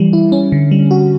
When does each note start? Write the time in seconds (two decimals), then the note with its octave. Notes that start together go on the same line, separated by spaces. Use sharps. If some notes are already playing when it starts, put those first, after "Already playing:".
Already playing: E3 G3
0.13 E4
0.32 C#4
0.52 D3
0.71 G3
0.91 F#4